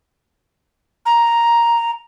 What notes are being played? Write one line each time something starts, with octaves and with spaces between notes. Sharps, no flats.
A#5